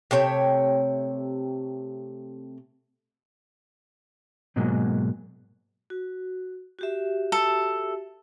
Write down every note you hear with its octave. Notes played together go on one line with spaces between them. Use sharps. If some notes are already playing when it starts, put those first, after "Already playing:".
C3 A3 C#5 G5
G#2 B2 F#3 G#3 A#3
F#4
F#4 G4 E5
A4